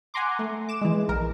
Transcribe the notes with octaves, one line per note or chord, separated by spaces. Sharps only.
F#5 G#5 A#5 C6 D6
A3
D6 E7
E3 G#3
A#1 A#4